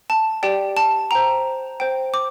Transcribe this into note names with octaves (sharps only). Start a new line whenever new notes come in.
A5
G4 D5 G5
A5
C5 G5 A#5
C5 G5
D6